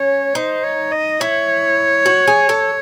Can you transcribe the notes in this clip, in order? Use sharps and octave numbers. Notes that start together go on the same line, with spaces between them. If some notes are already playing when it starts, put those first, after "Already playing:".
Already playing: C#4 C#5
D#4 C5
C#5
D#5
E4 C#5
F#4
G#4
A4